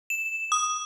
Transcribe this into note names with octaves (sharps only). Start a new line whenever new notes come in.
E7
D#6